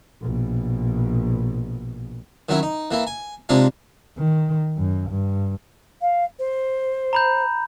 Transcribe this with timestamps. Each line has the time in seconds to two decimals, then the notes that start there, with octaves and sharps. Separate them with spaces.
0.22 A#1 B2
2.49 D#3 F#3 C#4 E4
2.63 D#4
2.91 E3 A#3 E4
3.07 G#5
3.49 C3 G#3 D4 D#4 F4
4.18 D#3
4.77 F#2
5.09 G2
6.01 F5
6.39 C5
7.13 A#5 B5 G6